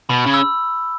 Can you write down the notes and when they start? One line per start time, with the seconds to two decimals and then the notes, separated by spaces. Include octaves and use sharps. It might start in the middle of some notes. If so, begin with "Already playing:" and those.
0.09 B2 B5
0.26 C#3
0.34 E6